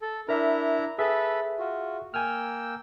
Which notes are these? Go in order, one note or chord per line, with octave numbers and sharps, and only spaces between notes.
A4
D4 E4 A#4 E5 A#5
G#4 A4 B4 E5
F4 F#4
A#3 G5 G#5 E6 F6